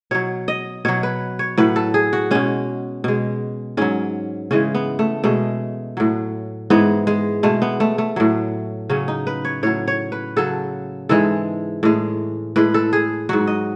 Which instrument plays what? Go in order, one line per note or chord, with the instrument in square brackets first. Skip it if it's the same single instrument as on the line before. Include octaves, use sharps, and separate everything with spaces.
[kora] B2 F#3 C#5
D#5
B2 F#3 C#5
B4
C#5
A2 F#3 B4
A4
G#4
F#4
B2 G#3 C#4
B2 G#3
G#2 F#3 C#4
C#3 E3 G#3 C#4
B3
A3
B2 G#3 A3
A2 F#3
G#2 E3 G#3 B3
G#3
B2 G#3 A3
B3
A3
A3
A2 F#3
C#3 F#3 C#4
D#4
B4
C#5
A2 F#3 C#5
C#5
B4
C#3 F#3 A4
G#2 E3 G#3 A4
A2 G#3
A2 G#3 B4
A4
G#4
G#2 F#3 F#4
D#5